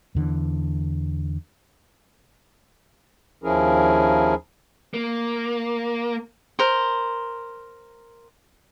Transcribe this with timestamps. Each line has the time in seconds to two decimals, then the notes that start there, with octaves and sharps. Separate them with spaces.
0.15 E2 D3 E3
3.44 D#2 F3 C#4 E4 G#4 A#4
4.94 A#3
6.59 A#4 C5